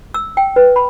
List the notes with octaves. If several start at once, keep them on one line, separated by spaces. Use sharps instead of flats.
E6
G5
B4
B5